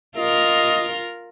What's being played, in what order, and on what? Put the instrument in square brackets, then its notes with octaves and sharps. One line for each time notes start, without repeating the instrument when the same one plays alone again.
[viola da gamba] F4 A#4 [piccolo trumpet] D#5